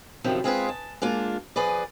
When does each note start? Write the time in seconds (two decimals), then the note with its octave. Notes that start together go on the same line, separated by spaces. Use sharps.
0.24 F#2 C3 D#3 F3
0.44 G#3 C4 F4 G#4 A4 B4
0.69 A5
1.02 G#3 A#3 D4 F4
1.56 F3 G#4 B4 D5